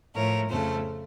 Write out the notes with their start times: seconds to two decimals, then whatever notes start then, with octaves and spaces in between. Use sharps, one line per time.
0.15 A2 F3 A3 A#4 C#5
0.49 F2 C#3 A3 A4 C5